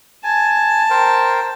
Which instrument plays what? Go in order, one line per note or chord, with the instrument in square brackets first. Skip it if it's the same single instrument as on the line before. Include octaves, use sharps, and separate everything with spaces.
[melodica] G#5 [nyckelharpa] A5
[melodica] A#4 C5 G5